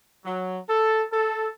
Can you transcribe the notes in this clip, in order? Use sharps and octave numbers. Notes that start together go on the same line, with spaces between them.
F#3
A4
A4